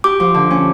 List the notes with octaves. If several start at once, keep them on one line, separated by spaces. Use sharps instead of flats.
G4 D6
F3
D3
C#4